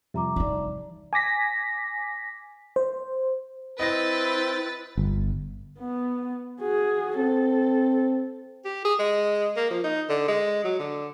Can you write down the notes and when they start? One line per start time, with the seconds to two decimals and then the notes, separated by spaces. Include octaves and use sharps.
0.14 F2 C3 G3 E5 A#5 D6
0.36 E3 D4 D#4
1.13 G#5 D6 A#6 B6
2.76 C5
3.79 C4 E4 B4 D#5 A6 A#6
4.97 G1
5.80 B3
6.62 F#4 G#4
7.18 C4 A4
8.65 G4
8.85 G#4
8.99 G#3
9.56 A#3
9.71 F3
9.84 D#4
10.09 D3
10.28 G#3
10.64 F#3
10.79 D3